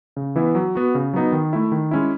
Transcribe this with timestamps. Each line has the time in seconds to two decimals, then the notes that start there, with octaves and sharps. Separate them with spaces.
0.16 C#3
0.36 E3 B3 E4
0.55 F#3
0.75 B3 F#4
0.95 C#3
1.13 F#3 B3 D#4
1.32 D#3
1.53 A3 E4
1.72 D#3
1.91 G#3 C#4 E4